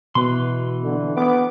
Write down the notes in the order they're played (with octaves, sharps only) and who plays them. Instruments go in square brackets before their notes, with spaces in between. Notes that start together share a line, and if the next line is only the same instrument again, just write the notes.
[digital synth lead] B2 [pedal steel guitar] E3 B4 C6
[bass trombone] D3
[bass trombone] B3 [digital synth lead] D6